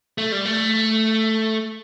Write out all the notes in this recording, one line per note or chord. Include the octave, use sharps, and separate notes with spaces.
A3
G3
A3